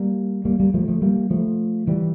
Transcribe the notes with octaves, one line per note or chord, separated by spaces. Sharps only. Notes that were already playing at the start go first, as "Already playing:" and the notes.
Already playing: G3 A#3
G3 A#3
G3 A#3
F3 A3
F3 A3
G3 A#3
F3 A3
E3 G3